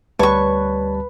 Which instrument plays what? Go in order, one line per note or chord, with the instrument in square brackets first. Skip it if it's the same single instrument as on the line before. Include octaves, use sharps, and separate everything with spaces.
[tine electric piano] D2 G3 A5 [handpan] B4 [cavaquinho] C#5 C#6